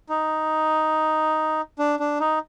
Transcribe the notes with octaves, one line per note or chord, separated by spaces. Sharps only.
D#4
D4
D4
D#4